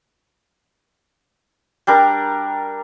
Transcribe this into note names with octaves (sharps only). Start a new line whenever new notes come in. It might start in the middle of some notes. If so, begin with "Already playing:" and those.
G3 D4 A#4